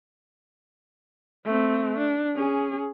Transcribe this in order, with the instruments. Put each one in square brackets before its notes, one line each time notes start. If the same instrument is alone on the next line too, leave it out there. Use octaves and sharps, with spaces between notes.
[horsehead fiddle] A3 C4
D4
C#4 G#4